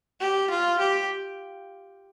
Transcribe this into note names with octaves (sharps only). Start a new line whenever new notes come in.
G4
F4
G4